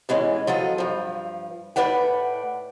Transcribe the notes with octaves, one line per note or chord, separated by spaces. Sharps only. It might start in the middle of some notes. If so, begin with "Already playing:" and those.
G#2 E3 G#3 C#4
F3 F#3 A4 D#5
G2 F3
A2 C#4 B4 D5 F#5 G5